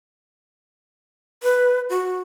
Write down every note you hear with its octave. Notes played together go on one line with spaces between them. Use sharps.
B4
F#4